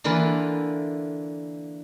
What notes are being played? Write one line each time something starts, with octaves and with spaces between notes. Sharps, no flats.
D3 E3 A#3 F4 B4